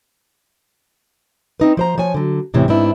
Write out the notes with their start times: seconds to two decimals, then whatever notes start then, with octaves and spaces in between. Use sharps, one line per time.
1.60 C4 D#4 B4
1.77 F3 C5 A#5
1.98 F3 C#5 G#5
2.14 D3 F#3
2.54 E2 A2 C3 E3 C#4
2.68 G#2 B3 C4 D4 E4